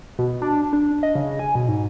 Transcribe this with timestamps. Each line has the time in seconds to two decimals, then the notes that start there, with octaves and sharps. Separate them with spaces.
0.19 B2
0.42 D4
0.73 D4
1.03 D#5
1.15 C#3
1.39 G#5
1.55 B2
1.68 G#2